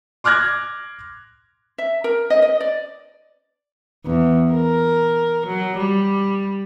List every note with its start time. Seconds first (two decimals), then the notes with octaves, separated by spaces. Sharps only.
0.24 C6 D6 F6 F#6 G#6 A#6
1.78 E5
2.04 A#4
2.30 D#5
2.42 D#5
2.60 D5
4.06 E2
4.53 A#4
5.47 F#3
5.78 G3